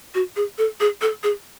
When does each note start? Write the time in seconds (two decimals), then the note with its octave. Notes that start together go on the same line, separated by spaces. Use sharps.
0.14 F#4
0.36 G#4
0.58 A4
0.80 G#4
1.01 A4
1.23 G#4